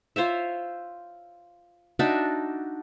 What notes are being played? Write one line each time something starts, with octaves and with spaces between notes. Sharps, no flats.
F4 C5 C#5 E5
D4 D#4 F#4 E5